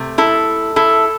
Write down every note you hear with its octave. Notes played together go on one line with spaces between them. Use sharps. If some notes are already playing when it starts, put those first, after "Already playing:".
Already playing: C3 A3
E4 A4
E4 A4